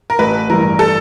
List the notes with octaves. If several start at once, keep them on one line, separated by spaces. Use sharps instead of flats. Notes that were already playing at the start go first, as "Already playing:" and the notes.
A#4
A1 B4
G2 E3 A#4
A4